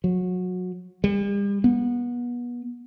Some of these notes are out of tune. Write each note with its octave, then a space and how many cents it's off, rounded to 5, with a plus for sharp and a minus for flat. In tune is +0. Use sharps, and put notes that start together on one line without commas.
F#3 -25
G3 +40
B3 -30